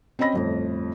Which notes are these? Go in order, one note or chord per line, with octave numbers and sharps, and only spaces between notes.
C4 C#4 D#5 B5 A#6
G1 F2 A2